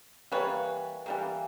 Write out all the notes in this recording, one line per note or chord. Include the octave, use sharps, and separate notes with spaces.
E3 G3 A#3 B4 C#5
E3 G3 A#3